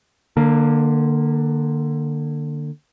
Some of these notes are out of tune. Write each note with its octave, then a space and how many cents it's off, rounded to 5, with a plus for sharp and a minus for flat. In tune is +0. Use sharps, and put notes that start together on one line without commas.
D3 +25 A#3 +0